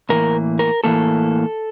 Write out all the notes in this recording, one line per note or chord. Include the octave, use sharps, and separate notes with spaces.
A2 E3 A#3 A#4
A#4
A2 E3 A#3 A4